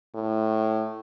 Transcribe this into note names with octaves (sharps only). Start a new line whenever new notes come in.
A2